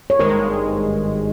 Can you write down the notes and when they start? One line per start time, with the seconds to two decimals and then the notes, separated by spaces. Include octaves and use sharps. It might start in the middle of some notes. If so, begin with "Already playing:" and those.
0.10 C#5
0.19 G#1 G2 D#3 G#3 A#4 C5